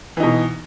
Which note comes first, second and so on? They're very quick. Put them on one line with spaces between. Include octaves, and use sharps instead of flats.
E3 D#4 B2